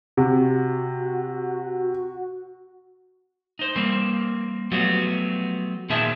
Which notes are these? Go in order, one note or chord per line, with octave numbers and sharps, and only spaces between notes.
C3 F#4
D#4 C5
G3 A#3 C4
F3 F#3 A3 B3 F#4 G4
A#2 D#3 C4 G#4 E5 A5